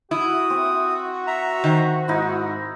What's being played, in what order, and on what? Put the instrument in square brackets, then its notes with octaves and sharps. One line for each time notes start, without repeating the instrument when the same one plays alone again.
[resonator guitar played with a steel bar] E4 [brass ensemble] F#4 [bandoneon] D#6
[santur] C4
[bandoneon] E5 A#5
[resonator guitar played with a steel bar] D#3 C5
[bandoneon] G#2 [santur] D#4 E4